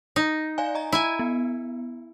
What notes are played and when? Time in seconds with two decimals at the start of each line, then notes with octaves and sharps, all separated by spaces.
0.16 D#4
0.58 D5 F5 G#5
0.75 D#5 A#5
0.92 E4 G#5
1.19 B3